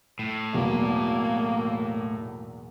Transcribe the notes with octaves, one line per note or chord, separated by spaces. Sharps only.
A2
B1 E2 A#3